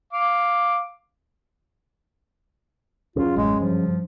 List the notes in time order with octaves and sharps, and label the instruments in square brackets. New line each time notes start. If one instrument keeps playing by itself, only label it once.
[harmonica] F5 D6
[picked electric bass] F#2 C#3 [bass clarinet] F4
[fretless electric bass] A1 [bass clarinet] G#3
[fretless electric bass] G2 [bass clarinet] F3